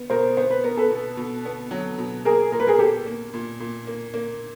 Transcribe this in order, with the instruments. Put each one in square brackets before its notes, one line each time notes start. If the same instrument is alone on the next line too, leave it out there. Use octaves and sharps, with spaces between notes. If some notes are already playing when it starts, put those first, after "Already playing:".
Already playing: [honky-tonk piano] B3
[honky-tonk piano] B2 [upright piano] A#4 C5
[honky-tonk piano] B3 [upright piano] C5
[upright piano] B4
[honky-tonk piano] B3 [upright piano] A#4
[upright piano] A4 B4
[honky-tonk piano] B2
B2
B3
F#3
B2
[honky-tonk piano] A#3 [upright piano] G#4 A#4
[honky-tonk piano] A#2 [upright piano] A#4
[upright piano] B4
G#4 A#4
[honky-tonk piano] A#3 [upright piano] G4 A4
[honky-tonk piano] A#3
A#2
A#2
A#3
A#3